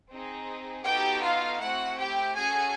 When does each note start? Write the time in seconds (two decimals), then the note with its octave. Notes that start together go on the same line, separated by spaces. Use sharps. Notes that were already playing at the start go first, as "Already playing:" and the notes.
0.12 C4 D#4 G#4
0.86 B3 D#4 F#4 G4 A4 G5
1.23 F4 F5
1.60 A3 C4 E4 F#4 F#5
1.98 G4 G5
2.35 C#4 F#4 G#4 A4 G#5